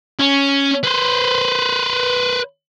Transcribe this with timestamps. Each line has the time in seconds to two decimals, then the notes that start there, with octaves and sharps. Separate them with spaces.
0.19 C#4
0.84 B4 C5